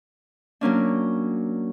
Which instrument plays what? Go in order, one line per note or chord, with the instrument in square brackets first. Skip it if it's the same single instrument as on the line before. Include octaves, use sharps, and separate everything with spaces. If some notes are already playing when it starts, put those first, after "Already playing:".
[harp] F#3 A#3 C#4 D4